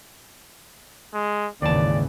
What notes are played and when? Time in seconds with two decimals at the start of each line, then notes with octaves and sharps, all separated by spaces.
1.13 G#3
1.62 G#1 D#2 C#3 E3 D5 A5